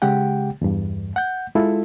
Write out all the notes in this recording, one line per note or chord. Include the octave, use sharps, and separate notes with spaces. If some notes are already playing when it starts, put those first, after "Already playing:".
C#3 G#3 G4 F#5 G5
E2 G2
F#5 G6
G#3 E4 F4 A4